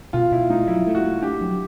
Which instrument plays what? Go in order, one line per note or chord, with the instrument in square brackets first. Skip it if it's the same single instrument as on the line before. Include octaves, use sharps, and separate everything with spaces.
[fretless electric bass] B2 [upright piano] F4
[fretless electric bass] B2 [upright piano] E4
[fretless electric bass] A3 [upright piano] D#4
[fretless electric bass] F#3 [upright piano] E4
[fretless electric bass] A3
[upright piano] F#4
[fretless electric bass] A3
[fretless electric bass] D4 [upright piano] G4
[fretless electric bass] F#3